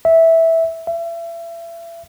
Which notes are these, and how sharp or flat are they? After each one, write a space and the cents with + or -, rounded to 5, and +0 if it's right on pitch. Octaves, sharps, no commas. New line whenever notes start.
E5 -10
E5 +35